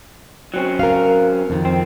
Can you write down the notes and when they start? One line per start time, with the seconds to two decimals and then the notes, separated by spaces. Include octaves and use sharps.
0.54 F#3 C4 C#4
0.79 A#4 F5
1.50 F2 D#3
1.65 C4